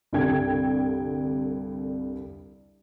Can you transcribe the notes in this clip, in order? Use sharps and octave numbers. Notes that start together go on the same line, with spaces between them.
C2 G2 D3 G5 G#6